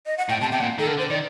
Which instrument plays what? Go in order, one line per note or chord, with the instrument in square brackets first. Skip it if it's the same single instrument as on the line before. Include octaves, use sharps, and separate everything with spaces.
[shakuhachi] D#5
F#5
[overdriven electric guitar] A2 [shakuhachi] G5
[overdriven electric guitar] C3 [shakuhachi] A5
[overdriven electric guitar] C3 [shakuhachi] G5
[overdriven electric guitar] A#2 [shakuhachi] F#5
[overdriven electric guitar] D#3 [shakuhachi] A4
[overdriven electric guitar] D3 [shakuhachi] A#4
[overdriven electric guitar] D3 [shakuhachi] C5
[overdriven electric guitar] D#3 [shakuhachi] D5